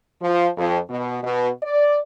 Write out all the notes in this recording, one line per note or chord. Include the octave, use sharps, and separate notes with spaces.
F3
F2
B2
B2
D5